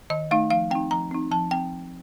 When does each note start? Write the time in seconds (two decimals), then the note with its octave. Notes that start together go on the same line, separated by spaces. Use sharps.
0.10 D#3 D#5
0.31 A3 D#4 F5
0.50 F3 F5
0.71 C4 D#4 G5
0.91 F3 A#5
1.11 C4 D#4
1.31 F3 A5
1.51 C4 G5